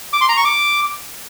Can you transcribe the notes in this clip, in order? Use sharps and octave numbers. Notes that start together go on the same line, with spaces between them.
D6
C6
A#5
C#6
D6